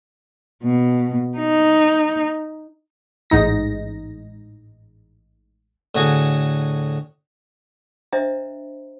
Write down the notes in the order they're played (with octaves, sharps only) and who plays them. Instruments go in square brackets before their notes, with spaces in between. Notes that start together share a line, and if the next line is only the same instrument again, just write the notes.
[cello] B2
D#4
[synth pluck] A1 G#2 D#4 A#6
[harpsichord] A2 D3 F#4 G#4
[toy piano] D4 C5 D#5 E5 A#5